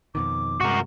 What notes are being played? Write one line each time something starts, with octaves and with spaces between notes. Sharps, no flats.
F2 B2 D#3 D6
G2 C3 G#3 F#4 A#4